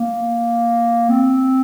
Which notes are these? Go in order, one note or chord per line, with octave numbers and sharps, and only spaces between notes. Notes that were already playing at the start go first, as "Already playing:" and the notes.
Already playing: A#3
C4